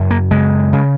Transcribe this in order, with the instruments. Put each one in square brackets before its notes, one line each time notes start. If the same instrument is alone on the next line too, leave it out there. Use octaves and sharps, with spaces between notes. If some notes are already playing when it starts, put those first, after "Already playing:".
Already playing: [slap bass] F#2 C#3
A#3
C#3 G#3
C#3